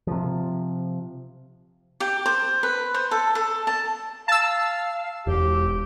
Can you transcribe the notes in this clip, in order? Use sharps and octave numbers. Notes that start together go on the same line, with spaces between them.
C3 F3
G4
C5
B4
C5
A4
A4
A5
F5 A5 E6
E1 G4